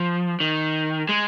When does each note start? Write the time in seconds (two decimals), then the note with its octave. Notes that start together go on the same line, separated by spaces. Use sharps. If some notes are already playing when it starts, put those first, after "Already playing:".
Already playing: F3
0.40 D#3
1.09 G#3